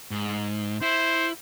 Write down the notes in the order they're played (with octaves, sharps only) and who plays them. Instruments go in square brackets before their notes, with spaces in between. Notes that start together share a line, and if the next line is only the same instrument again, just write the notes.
[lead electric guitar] G#2
[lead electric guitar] E4 [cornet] C5